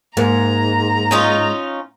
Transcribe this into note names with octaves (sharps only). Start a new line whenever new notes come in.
G#2 A#3 A#5
C#4 D#4 F4